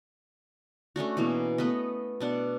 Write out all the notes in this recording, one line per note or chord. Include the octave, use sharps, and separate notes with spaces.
A3 C#4 D4 F#4
B2 E3 A#3
A3 B3 B4 D#5
B2 D4 F#5